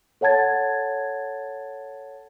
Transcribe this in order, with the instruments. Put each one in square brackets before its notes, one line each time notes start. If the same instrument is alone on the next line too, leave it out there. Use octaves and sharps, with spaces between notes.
[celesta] A4 C#5 F#5 A5 G#6 A6